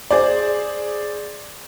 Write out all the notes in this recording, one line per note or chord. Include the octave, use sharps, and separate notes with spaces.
G#4 C5 D5